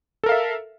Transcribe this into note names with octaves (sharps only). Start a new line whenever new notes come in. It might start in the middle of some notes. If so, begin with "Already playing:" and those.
A4 A#4 E5 F5